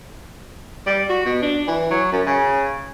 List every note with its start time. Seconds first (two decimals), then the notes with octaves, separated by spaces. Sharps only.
0.86 G3
1.09 F#4
1.25 B2
1.42 D4
1.68 E3
1.91 F#3
2.12 F#2
2.26 C#3